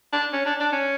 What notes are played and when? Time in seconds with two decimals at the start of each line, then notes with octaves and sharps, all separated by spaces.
0.13 D4
0.33 C#4
0.46 D4
0.60 D4
0.72 C#4